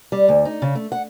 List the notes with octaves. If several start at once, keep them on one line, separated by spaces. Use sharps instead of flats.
G3
D2
D#4
C#3
A3
F#5